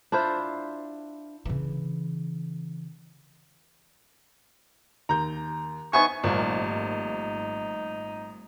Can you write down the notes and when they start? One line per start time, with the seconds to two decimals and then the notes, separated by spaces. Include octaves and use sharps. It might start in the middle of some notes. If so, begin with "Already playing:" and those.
0.12 D4 E4 F4 C5
1.45 C#3 E3
5.09 D#2 A#5 G6
5.93 B3 D#4 C5 E5 G#5 C#6
6.24 G#1 A#2 F3 G3 A3 D#4 G4